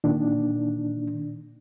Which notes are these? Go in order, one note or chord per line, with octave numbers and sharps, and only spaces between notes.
A#2 D#3 D4